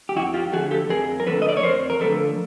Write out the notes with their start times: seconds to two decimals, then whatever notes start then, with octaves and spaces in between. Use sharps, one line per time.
0.09 G4
0.15 F2 E4 F#4
0.34 F4 G4
0.52 D3 F3 A3 F#4 G#4
0.71 G4 A4
0.89 F2 G#4 A#4
1.20 A#4
1.26 D3 F3 A3 A4 B4
1.42 D#5
1.49 D5
1.57 C#5
1.63 F2 A#4 C5
1.90 A#4
2.00 D3 F3 A3 A4 B4